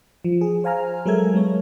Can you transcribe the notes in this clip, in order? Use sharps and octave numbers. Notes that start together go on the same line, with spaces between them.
F3
G#4
C5 F5 G#5 A#5 F6
F#3 G#3 A4 A#4 E5 G#6
F#3 G#3 B3 C#5